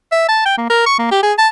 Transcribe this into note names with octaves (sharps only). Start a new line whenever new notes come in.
E5
A5
G5
A#3
A#4
C#6
A#3
G4
G#4
A5